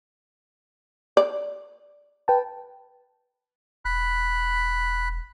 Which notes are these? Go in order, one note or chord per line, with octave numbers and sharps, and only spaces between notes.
D5
B4 G5 A5
E1 B5 F#6